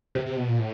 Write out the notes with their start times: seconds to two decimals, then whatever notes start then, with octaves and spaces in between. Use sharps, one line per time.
0.15 C3
0.26 C3
0.37 B2
0.48 A#2
0.59 A2